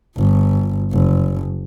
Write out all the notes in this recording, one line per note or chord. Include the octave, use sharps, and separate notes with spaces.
G1
F#1